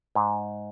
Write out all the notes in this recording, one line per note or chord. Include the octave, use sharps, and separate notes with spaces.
G#2